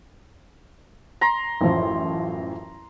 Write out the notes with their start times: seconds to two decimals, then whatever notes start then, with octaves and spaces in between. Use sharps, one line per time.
1.21 A#5 C6
1.61 A1 F#2 F3